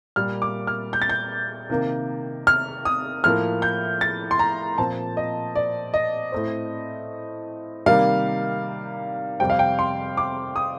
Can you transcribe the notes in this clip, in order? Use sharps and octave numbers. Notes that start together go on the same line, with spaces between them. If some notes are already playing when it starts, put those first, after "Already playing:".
A#2 G3 A#3 F6
D6
F6
G6
A6
G6
C3 D#3 A#3
F6
D#6
A2 F3 A#3 F6
G6
A6
C6
A#5
A#2 F3 C4 A5
D#5
D5
D#5
A2 A3 C4
C3 D#3 G3 A#3 F5
F2 C3 G3 C4 G5
F5
G5
C6
D6
D#6